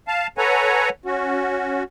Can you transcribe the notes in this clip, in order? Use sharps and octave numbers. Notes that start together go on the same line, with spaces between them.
F5 A5
A4 B4 C#5 F#5 G#5 A#5
C#4 F#4